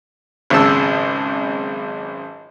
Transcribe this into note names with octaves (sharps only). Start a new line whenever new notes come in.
G#1 C#2 F#2 G#3 A5 E6